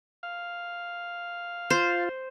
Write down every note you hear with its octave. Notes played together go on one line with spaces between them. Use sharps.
F5
F4 C5